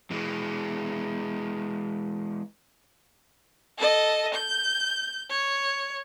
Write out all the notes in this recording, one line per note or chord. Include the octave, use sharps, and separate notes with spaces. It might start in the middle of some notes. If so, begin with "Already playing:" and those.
E3 G#3
A4 D#5
G6
C#5